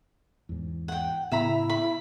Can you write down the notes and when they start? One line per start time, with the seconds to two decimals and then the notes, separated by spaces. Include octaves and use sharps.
0.49 E2 G#2
0.88 F#5 G5
1.32 A2 C#3 B3 E4 E5 A#5 B5
1.70 B5